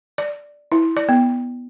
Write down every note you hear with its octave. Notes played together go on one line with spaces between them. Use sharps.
D5
E4
D5
B3